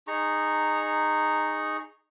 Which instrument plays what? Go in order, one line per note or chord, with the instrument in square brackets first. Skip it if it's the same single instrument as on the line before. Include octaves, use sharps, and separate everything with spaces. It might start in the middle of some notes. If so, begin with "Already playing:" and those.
[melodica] D#4 G#4 A#5 C#6